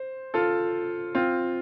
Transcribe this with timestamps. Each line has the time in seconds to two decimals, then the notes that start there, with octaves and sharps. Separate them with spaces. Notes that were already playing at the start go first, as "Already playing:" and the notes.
Already playing: C5
0.34 F4 A4
1.15 C4 F4